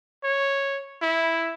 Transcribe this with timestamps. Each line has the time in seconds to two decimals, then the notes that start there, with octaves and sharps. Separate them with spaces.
0.24 C#5
1.02 E4